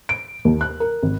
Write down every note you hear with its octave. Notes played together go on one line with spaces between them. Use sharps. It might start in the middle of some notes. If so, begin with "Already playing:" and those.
D7
D#2
F#6
A#4
G#1